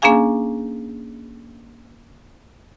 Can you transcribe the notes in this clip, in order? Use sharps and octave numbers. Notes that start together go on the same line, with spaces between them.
A#3 C#4 D4 G#4 F5 G#5